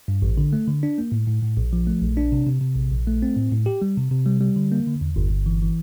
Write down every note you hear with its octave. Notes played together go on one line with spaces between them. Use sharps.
G2
A1
D3
A3
D3
D4
A#3
A2
A2
A2
A#1
F3
A3
A#1
D4
C3
C3
C3
A#1
A#1
A3
C4
A2
A2
G4
G3
C3
C3
G3
G3
D3
A#3
D3
E2
G1
G1
E3
E3